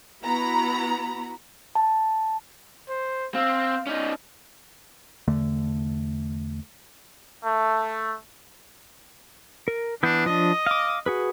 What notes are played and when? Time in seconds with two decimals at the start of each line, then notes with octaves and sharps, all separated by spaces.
0.22 B3 E4 F#4 A#5 B5
1.75 A5
2.89 C5
3.35 C4 F5
3.87 C#4 D#4
5.28 E2 D3 A3
7.44 A3
9.68 A#4
10.03 E3 B3 D4 G6
10.26 F3 D4 D#5
10.67 F5 D6
11.06 F#4 G#4 B4